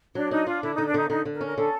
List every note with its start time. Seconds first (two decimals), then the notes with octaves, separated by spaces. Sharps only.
0.15 F#3 D4
0.31 D4 D#4
0.47 D4 F4
0.62 D3 E4
0.74 D3 D#4
0.86 D4
0.94 D3 D#4
1.09 D3 D#4
1.25 D3
1.33 A#4
1.41 C#4
1.46 A#4
1.57 D3 A4